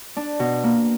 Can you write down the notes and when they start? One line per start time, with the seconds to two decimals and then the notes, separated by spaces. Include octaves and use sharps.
0.16 D4
0.39 B2
0.63 A#3